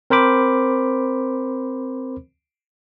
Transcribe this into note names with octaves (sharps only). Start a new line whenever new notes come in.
C4 A#4 C5 B5 D6